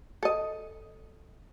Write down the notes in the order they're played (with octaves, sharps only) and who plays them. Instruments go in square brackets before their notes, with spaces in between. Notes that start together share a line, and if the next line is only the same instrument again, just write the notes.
[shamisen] A4 D#5